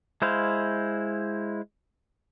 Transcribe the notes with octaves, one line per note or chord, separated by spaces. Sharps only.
G#3 E4 C5 F5